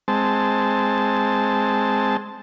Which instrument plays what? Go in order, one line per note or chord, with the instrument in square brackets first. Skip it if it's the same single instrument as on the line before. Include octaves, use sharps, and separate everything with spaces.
[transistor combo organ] G#3 C4 A5